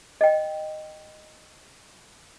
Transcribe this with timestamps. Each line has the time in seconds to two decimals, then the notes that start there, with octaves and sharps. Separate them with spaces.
0.21 D#5 G5